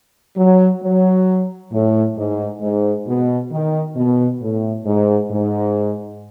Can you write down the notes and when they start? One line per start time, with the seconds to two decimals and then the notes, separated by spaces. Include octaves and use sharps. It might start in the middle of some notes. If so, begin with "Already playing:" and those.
0.37 F#3
0.83 F#3
1.72 A2
2.18 G#2
2.62 G#2
3.07 B2
3.52 D#3
3.96 B2
4.42 A2
4.86 G#2
5.31 G#2